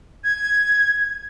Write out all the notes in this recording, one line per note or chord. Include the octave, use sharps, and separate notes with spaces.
G#6